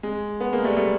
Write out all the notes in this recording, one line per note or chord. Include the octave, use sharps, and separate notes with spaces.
G#3
B3
G#3 A#3
G3 A3
G3 A3